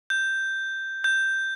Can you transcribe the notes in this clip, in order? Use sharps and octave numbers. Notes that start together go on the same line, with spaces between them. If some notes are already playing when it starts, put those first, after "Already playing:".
G6
G6